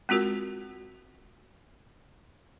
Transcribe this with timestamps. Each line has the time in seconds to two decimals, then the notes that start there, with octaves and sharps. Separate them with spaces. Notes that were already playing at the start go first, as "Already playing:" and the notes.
0.09 G#3 C4 F4 F#4 A#4